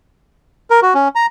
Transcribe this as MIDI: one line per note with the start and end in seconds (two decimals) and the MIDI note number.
0.70 0.80 70
0.82 0.94 66
0.95 1.08 61
1.15 1.26 82